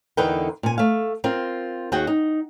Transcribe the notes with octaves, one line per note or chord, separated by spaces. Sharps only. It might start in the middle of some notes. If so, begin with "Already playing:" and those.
E2 D3 D#4 A#4 B4 G5
A#2 G#5
A3 F5
C4 F4 A#4
D#2 F#4 G#4 F#5 G5
D#4